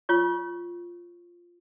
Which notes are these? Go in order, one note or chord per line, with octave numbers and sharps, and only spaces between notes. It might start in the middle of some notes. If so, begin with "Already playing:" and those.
F4 C#5 C#6